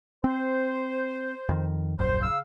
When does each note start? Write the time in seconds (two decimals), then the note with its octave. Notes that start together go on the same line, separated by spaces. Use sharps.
0.24 C4 C5
1.49 F2 D#3
1.99 D#1 A#1 F#2 C5
2.22 C#3 F5 E6